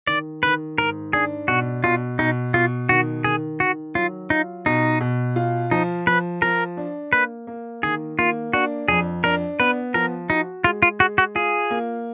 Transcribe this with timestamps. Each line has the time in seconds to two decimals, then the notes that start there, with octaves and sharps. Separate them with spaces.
0.07 D#3 D5
0.43 D#3 B4
0.78 G#2 A#4
1.13 D4 G#4
1.48 B2 F#4
1.84 B2 F4
2.19 B2 D#4
2.54 B2 F4
2.89 D#3 F#4
3.24 D#3 G#4
3.60 D#3 F#4
3.95 F#3 F4
4.30 D#4 F4
4.66 B2 D#4
5.00 B2
5.36 F4
5.71 F3 D#4
6.07 F3 B4
6.42 F3 A#4
6.77 D4
7.13 A#3 B4
7.47 A#3
7.83 D#3 G#4
8.19 A#3 F4
8.53 D4 F#4
8.88 F2 G#4
9.24 D4 A#4
9.60 B3 B4
9.94 F3 A#4
10.30 D#4 F#4
10.64 G#3 F4
10.83 F4
11.00 G#3 F#4
11.18 F#4
11.35 F4 G#4
11.70 A#3